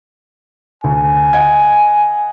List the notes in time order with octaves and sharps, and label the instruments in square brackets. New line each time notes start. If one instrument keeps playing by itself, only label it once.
[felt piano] D2 [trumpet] G#5
[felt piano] D#5 F#5 G#6